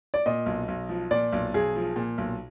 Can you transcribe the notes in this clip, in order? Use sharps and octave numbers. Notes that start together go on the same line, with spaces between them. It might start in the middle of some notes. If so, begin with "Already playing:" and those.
D5
A#2 D#5
B1
B1
F3
A#2 D5
B1
B1 G#4
F3
A#2
B1